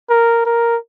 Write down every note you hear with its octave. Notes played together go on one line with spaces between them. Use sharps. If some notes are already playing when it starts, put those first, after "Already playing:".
A#4
A#4